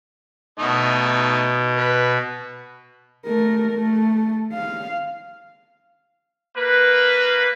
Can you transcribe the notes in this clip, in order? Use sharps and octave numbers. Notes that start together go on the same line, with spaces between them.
B2 A3 D#4 D#5
B4
A3 A#4
A3
F5
A#3 B4